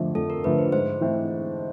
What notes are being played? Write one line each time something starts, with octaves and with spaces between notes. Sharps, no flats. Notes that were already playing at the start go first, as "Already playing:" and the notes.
Already playing: F2 D3 F3 A3
F2 A4
A#4
D3 F3 A3 B4
C5
G#2 C5
E3 A3 C4